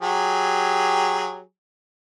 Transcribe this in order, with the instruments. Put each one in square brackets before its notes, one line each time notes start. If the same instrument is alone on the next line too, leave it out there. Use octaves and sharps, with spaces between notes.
[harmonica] F#3 G4 G#4